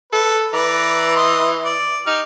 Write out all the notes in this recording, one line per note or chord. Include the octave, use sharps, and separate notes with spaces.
A4 B4
E3 B4 D5 A#5
D#5 C6
D5
D#4 G4 F6